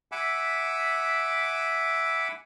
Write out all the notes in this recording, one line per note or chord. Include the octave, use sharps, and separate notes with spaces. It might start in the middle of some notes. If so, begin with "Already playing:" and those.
E5 F#5 G#5 B5 D6 E6